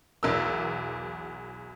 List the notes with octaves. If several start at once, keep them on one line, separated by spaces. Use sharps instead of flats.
B1 E2 E3 A#4 E6